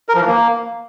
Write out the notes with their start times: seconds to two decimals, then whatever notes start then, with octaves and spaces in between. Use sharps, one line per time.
0.09 A#4
0.15 F3
0.21 E3
0.27 A#3